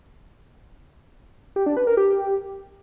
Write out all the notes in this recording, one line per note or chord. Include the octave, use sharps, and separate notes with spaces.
G4
D4
B4
A#4
G4